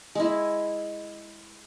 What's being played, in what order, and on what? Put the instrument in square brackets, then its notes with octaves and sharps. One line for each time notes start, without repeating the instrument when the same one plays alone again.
[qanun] G#3 E4